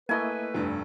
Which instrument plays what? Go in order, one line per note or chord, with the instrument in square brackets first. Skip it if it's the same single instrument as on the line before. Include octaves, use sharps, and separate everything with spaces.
[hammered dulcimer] A3 G#5 [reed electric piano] A#3 E4 D#5 [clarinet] B4
[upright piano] F1 G2